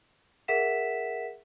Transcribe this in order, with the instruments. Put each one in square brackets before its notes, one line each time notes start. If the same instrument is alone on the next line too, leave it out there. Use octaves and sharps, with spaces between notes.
[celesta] G#4 A#4 E5 F#5 B6 E7